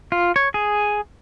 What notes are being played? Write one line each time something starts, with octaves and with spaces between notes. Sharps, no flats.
F4
C#5
G#4